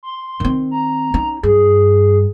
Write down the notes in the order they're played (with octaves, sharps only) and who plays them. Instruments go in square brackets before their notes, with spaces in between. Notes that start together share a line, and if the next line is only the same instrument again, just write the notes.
[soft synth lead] C6
[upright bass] D#3 C4
[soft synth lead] A#5
[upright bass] C#4 D#4
[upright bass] G2 [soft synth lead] G#4